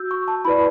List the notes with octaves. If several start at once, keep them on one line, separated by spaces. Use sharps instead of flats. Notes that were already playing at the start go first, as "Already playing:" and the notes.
Already playing: F#4 E6 G6
C#6
A5
E4 B4 D5 B5